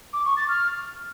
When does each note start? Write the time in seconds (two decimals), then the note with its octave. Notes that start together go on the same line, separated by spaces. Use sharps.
0.13 D6
0.24 C#6
0.36 A6
0.48 F6